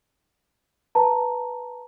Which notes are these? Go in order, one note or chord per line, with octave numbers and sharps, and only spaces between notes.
B4 A5 A#5